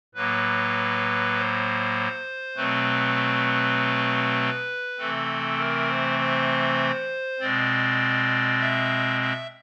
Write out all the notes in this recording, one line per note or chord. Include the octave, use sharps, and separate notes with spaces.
A2 F#3 A#3 B4
C5
B2 F#3 A3 C4 B4
C3 E3 A3 C4 A4
A#4
C5
C5
B2 G#3 C4 D5
E5
E5